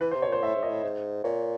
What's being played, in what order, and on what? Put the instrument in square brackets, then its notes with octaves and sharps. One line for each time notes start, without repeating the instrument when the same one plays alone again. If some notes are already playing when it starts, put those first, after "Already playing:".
[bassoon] E3 [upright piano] B4
[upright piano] C5
[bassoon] C3
[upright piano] C#5
[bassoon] A#2 [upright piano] C5
[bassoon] A2 [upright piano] E5
[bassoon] G#2
[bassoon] A#2 [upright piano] D#5
[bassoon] A2
G#2
[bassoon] A#2 [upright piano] C#5